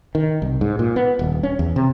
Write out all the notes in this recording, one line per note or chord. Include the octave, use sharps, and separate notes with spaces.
D#3
C2
G#2
A#2
B3
D#1
C#4
E2
C3